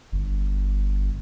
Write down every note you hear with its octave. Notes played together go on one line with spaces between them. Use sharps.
G1